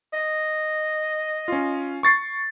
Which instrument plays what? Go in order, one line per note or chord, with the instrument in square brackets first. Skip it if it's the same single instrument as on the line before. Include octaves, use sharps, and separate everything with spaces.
[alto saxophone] D#5
[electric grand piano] C#4 F4
C#6 A6 C7